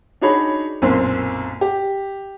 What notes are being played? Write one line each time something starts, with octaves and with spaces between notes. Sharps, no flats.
D4 D#4 F#4 G#4 C#5 B5
B1 F#2 A#2 C4
G4